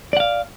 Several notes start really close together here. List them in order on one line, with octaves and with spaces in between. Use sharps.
D5 F#5 F5